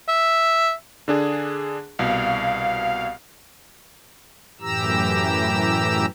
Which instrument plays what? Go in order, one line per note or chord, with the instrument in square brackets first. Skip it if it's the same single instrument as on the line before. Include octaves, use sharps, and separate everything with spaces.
[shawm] E5
[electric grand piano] D3 D4 G#4
[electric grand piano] C2 B2 [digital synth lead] F5
[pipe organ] F#2 A2 E3 G4 A#5 E6